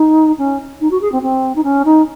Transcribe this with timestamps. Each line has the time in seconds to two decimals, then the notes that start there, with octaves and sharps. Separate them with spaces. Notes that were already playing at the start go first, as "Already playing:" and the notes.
Already playing: D#4
0.38 C#4
0.80 D#4
0.91 F#4
1.01 G#4
1.12 C4
1.22 C4
1.55 D#4
1.63 C#4
1.85 D#4